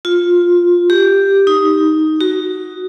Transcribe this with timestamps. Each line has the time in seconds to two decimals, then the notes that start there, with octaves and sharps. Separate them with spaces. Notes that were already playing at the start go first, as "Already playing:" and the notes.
0.05 F4
0.90 G4
1.47 D#4
2.21 F#4